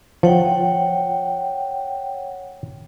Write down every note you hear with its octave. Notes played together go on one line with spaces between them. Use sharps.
F3 C#5 F#5 G5